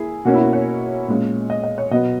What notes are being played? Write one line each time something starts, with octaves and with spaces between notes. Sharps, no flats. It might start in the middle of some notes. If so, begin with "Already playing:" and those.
Already playing: A#3 E4 G#4
B2 A#3 C#4 F#4
E4
F#4
C#5
A#2 G#3 C#4
D#5
D#5
C#5
B2 F#3 B3 D#5